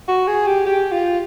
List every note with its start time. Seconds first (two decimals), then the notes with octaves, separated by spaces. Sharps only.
0.08 F#4
0.28 G#4
0.47 G4
0.66 G4
0.92 F4